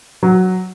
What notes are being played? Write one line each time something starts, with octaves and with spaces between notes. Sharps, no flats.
F#3